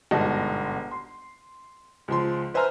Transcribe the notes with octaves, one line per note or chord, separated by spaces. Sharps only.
G1 G#2 B2 D#5 A5
C6
C#2 F3 C6
B4 C5 E5 G#5 A#5 F6